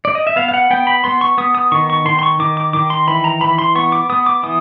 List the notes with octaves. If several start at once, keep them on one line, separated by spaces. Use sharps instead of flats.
D5
D#5
E5
B3 F5
F5
F#5
B3 G5
B5
B3 C6
C#6
B3 D#6
D#6
D#3 C#6
C#6
D#3 C6
C6
C#6
D#3 D6
D6
D#3 D6
C6
E3 B5
A#5
E3 B5
C6
B3 C#6
D6
B3 D#6
D6
E3 D#6